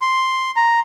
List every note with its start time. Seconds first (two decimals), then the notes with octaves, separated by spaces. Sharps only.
0.02 C6
0.56 A#5